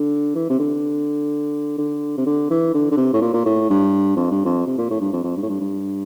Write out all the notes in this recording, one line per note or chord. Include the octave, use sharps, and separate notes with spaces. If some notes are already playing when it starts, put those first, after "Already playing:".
Already playing: D3
E3
C3
D3
D3
C3
D3
E3
D3
D3
C3
A2
A#2
A#2
A2
G2
F2
G2
F2
C3
A#2
A2
G2
F2
F2
G2
A2
G2
G2